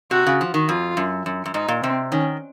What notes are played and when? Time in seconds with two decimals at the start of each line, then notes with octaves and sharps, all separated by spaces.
0.11 C3 F#4
0.26 C#3
0.41 F3
0.54 D#3
0.69 F2 F4
0.97 F#2
1.26 F#2
1.46 F#2
1.54 G#2 D#4
1.68 A#2
1.83 C3 C4
2.12 D#3 C#4